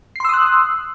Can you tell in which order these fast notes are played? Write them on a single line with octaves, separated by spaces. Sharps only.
C7 C6 E6 D#6 F#6